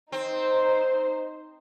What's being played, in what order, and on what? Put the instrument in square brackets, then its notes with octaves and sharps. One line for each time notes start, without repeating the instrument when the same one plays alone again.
[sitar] C4 [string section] D#4 C5